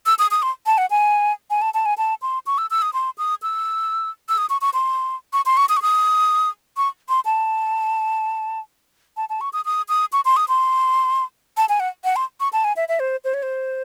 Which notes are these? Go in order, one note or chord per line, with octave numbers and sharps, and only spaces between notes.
E6
D#6
D#6
C6
A5
F#5
G#5
G#5
A5
A5
G#5
A5
C6
C#6
E6
E6
D#6
C6
D#6
E6
E6
D#6
C#6
C#6
C6
C#6
C6
C#6
D#6
C#6
D#6
C#6
C6
A5
A5
A5
C#6
D#6
D#6
D#6
C#6
C6
D#6
C6
A5
G#5
F#5
F#5
C6
C#6
A5
G#5
E5
E5
C5
C5
C#5
C5